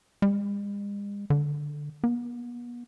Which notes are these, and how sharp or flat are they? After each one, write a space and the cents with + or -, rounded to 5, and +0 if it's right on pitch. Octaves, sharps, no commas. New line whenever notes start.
G#3 -45
D3 +5
B3 -40